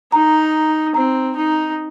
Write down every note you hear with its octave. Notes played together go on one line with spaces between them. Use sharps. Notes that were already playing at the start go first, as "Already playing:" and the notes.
D#4 A#5
C4 A#5
D#4